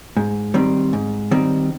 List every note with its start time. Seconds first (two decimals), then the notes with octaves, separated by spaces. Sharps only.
0.17 G#2
0.54 D#3 G3 C4
0.93 G#2
1.31 D#3 G3 C4